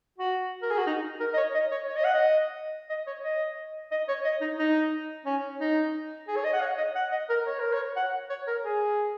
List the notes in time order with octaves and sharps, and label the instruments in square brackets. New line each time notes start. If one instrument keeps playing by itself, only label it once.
[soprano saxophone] F#4
A#4
G#4
F#4
D#4
A#4
D#5
C#5
D#5
C#5
C#5
D#5
F#5
D#5
D#5
C#5
D#5
D#5
C#5
D#5
D#4
D#4
C#4
D#4
G#4
C#5
D#5
F#5
C#5
D#5
F#5
D#5
A#4
C#5
A#4
C#5
F#5
C#5
A#4
G#4